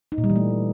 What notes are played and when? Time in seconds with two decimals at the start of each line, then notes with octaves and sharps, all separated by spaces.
0.12 D#4
0.18 A#2
0.24 G3
0.30 E3
0.36 A3